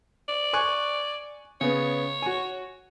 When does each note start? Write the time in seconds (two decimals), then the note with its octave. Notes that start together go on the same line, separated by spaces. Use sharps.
0.29 D5
0.53 G#5 C#6 F#6
1.61 C#3 B3 C#5
2.22 F#4 G#5